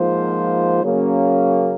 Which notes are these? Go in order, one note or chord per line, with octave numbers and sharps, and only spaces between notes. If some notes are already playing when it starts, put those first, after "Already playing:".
Already playing: G#2 F3 A#3 F4 C5
C#3 F#3 A#3 C#4